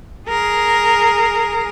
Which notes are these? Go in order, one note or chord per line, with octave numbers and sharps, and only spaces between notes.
G#4 A#4